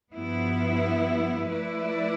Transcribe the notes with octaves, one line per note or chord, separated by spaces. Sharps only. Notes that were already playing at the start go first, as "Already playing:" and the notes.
G2 F3 B3 E4
F3 A3 E4 B4 D5